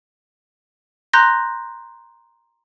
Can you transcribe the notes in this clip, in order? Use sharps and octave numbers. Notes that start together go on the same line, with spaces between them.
A#5 C6 F#6 G6 A#6